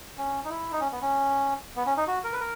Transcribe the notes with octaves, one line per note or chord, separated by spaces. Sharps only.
C#4
D#4
E4
D#4
C#4
B3
C#4
B3
C#4
D#4
F#4
A#4
B4
A#4